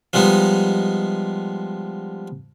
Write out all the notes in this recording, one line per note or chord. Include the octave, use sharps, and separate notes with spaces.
F3 G3 G#3 B3 D#4